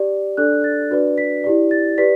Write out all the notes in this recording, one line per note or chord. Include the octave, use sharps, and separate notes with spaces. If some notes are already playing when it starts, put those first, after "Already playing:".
Already playing: G4 D5
D4 A4 D5 F#6
A6
D4 F#4 B4 D5
B6
E4 G4 D5
A6
G4 B4 D5 B6